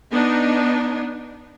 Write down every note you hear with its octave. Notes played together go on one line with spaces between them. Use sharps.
B3 D4 D#4